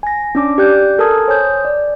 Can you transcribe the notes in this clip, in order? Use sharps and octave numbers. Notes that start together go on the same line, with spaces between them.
G#5 A#6
C#4 D4 D6
G4 D5 F#6 G6
A4 A#4 G#5 A5 D#6 G#6
C5 C#5 G#5 D#6 G6
D5